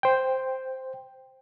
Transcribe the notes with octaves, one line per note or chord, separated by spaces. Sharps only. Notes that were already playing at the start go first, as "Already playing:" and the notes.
C5 G5